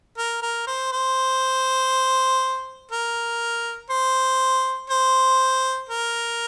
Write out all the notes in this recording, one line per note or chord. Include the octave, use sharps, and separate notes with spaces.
A#4
A#4
C5
C5
A#4
C5
C5
A#4